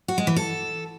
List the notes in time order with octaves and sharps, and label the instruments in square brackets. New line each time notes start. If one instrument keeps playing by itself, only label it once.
[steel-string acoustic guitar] F#4
G#3
E3
A4